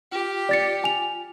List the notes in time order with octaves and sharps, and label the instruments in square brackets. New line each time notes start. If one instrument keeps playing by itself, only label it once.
[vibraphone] F4 [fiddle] G4
[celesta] D5 A6 C#7
G#5 F7